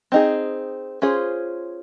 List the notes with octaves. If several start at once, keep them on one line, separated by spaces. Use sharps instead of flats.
C4 D#4 G#4
C#4 F4 G#4 C5